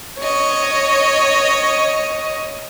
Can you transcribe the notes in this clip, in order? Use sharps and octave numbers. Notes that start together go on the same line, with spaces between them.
C#5 D#5